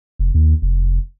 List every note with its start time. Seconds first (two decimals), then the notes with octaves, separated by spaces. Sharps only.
0.19 F1
0.35 D#2
0.62 F1